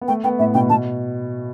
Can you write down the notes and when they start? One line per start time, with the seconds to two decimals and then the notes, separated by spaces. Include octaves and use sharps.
0.01 B3
0.08 A3 G5
0.24 B3 G5
0.39 A2 E5
0.54 B2 G5
0.70 B2 A5